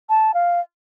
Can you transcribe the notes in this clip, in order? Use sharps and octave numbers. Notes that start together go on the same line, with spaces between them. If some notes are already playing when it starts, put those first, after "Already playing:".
A5
F5